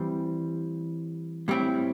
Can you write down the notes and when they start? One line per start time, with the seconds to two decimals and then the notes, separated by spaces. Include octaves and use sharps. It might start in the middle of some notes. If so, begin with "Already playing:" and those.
Already playing: E3 G3 C4
1.48 A2 G3 C4 E4